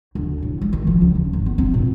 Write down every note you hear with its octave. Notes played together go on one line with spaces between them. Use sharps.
D2
A2
G#3
D#3
F3
C#2
D#2
G#1
B3
C4
A#2